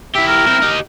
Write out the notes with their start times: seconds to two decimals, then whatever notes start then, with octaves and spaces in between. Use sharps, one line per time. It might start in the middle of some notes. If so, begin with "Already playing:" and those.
0.15 E4 G4 E5
0.27 A#4
0.47 C4 E4
0.62 D#4 G4